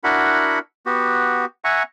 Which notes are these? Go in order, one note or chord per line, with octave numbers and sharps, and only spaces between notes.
D4 E4 F#4 A#4 F#5 B5
B3 F#4 G4
E5 F#5 G#5 A#5 C#6